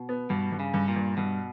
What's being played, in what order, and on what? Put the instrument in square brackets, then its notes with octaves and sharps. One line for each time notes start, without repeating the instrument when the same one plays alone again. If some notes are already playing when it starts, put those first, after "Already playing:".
Already playing: [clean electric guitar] B2
[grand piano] B3
[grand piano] G2 [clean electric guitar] B2
[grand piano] G2
[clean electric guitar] C#3
[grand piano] G2
[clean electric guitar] A#2
[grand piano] G2
[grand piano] G2 [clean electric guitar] B2